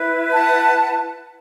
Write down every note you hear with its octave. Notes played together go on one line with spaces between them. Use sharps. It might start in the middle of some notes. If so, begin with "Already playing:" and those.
Already playing: E4 B4
F#5 A5